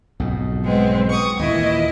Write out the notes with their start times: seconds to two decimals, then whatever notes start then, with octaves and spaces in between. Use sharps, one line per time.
0.20 B1 F2 G#2
0.63 G#3 B3 C4
1.10 C#6 D#6
1.39 D#2 A#2 E3 A#3 E4 D#5